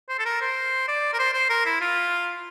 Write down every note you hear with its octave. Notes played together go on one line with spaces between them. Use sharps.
C5
A4
A#4
C5
D5
A#4
C5
C5
A#4
E4
F4